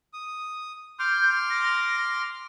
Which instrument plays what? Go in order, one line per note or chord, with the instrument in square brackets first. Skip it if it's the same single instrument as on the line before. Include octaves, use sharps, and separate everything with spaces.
[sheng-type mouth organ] D#6
[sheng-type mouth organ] C6 D6 F6 [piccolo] G6
[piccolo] A#6